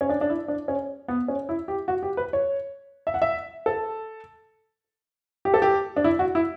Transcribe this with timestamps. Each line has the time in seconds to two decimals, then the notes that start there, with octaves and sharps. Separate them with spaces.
0.01 C#4
0.09 D4
0.21 D4
0.30 E4
0.48 D4
0.68 C#4
1.08 B3
1.28 C#4
1.49 E4
1.68 G4
1.88 F#4
2.03 G4
2.17 B4
2.33 C#5
3.07 E5
3.14 F#5
3.22 E5
3.66 A4
5.45 G4
5.54 A4
5.62 G4
5.97 D4
6.04 E4
6.19 F#4
6.35 E4